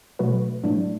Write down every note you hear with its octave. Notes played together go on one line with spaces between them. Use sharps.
B2 F#3 A3 F#4 B4
A2 F#3 A3 D4 E4